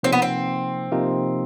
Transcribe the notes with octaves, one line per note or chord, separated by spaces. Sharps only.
C3 F3 A#3 C4 D#4
B3
C4
C3 F3 A#3 D#4